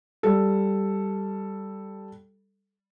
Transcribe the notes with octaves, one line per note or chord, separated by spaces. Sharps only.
G3 A4